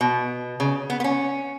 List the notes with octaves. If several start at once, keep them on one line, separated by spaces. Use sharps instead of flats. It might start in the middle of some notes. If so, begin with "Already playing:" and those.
B2
C#3
B3
B3
C#4